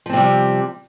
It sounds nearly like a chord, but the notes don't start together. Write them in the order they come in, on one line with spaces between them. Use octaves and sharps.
F3 C4 C3 G3